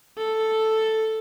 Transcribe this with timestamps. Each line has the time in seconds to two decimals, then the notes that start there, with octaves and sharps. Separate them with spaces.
0.18 A4